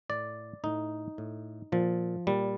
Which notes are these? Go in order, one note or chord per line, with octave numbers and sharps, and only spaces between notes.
A2 D5
A2 D#4
A2
A#2 F3
A#2 G3